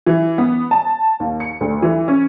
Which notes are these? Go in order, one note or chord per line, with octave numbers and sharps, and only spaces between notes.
E3
B3
A5
D#2
C#7
D2
E3
C#4